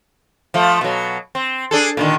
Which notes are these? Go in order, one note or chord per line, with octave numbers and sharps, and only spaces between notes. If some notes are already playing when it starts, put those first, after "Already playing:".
F3 A3
B2 F#3
C4
D4 G#4 A4
A#2 D3 D#3